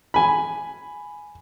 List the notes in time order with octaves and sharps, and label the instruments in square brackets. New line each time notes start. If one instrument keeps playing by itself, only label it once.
[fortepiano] G#5 B5